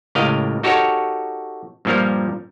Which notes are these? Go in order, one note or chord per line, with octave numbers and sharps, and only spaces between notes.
C#2 A2 G4 A#4 D#5 F5
D#4 F#4 G4 A4 A#4 C#5
G2 A#2 F3 G3 A#4